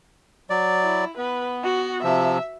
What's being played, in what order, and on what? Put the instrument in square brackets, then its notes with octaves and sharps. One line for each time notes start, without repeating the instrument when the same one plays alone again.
[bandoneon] F#3 D5
[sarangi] E4
[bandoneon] B3 [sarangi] B4
[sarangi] F#4
[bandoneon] C3 F3 [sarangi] E5